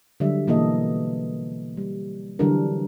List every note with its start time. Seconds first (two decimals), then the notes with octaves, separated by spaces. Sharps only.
0.20 D3 F#3 G3 E5
0.47 B2 E3 A#3 A4 D#5
1.77 G3
2.39 D3 E3 F#3 G3 D4 A#4